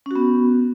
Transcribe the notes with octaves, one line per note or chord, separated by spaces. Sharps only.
B3 C#4 F#4